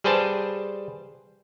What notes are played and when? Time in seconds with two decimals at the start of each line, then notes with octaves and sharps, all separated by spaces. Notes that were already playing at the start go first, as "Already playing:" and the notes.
0.04 G3 G#4 B4 C5 G5 A5